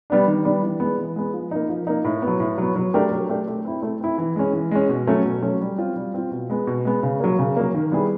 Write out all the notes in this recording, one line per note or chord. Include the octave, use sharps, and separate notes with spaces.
G3 B3 D4
D#3
G3 B3 D4
E3
G#3 B3
E3
G#3 B3
F3
A#3 D#4
F3
A#3 D#4
A2
B3
F#3
A2
F#3 B3
F#3
A3 D4 G4 A#4
F#3
A3 D4 G4 A#4
A3
C4 E4
A3
C4 E4
E3
G#3 C#4
E3
G#3 C#4
B2
F#3 A3 C#4
B2
F#3 A3 C#4
G3
C4 F4
G3
C4 F4
B2
G#3 B3
B2
G#3 B3
C#3
F#3 A#3
C#3
F#3 A#3
D#3
G3 B3 E4 G#4